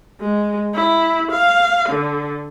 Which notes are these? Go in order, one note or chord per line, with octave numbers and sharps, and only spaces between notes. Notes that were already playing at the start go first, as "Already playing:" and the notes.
G#3
E4
F5
D3